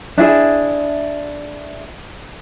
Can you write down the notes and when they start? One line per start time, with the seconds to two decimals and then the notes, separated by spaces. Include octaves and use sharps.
0.18 D4 E4 G#4 E5